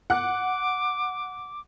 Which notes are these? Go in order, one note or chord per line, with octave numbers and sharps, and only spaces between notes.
F#5 D6 F#6